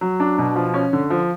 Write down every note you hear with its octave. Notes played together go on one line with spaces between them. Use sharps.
F#3
D4
B2
F3
C#4
D3
F3